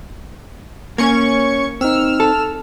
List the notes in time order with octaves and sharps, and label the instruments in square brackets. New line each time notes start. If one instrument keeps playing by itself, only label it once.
[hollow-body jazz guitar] A#3 [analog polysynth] C#4 C#6 G#6
[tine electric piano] C4 D#4 [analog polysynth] E6 F6
[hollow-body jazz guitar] A4